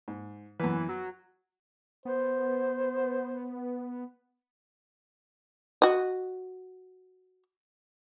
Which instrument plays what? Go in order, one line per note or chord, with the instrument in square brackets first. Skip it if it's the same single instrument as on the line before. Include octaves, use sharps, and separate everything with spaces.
[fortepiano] G#2
[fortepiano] F#2 B3 B4 [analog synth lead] E3
[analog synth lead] F#3
[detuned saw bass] B3 [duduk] C5
[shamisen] F#4 D#5